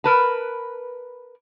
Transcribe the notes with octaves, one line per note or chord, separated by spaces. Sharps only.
A#4 B4 A5